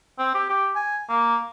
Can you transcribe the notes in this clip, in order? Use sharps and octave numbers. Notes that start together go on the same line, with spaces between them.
C4
G4
G4
G#5
A#3